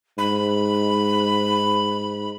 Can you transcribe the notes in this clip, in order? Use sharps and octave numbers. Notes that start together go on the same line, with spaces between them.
G#2 B5